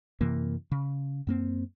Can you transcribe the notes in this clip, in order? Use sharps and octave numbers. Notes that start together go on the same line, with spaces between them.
F#2 C3 E3 A#3
C#3
F#2 A#3 C4